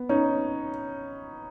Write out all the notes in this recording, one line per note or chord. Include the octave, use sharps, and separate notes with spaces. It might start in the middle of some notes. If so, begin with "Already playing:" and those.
Already playing: B3
C#4 D#4